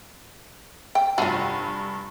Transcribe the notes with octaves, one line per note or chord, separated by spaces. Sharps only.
G5
F1 G2 F4 F#4 D#7